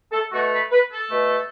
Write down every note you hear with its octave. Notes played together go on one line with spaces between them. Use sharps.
A4
B2 A3 F#4
B4
B4
A4
B2 A3